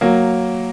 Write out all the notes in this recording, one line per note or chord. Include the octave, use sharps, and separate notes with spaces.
F#3 A#3